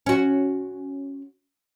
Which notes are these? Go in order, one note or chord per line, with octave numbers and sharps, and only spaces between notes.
C#4 F#4